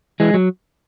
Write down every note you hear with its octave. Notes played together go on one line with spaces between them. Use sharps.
E3 G#3
F#3